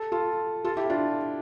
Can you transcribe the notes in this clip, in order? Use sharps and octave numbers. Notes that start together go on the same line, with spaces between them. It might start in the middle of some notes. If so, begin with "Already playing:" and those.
Already playing: A4
F4 A4
F4 A4
E4 G4
D4 F4